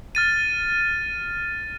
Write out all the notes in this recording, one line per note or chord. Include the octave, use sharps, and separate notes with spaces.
F6 A6 D#7